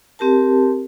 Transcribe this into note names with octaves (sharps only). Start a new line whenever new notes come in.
C4 G4 A#4 A5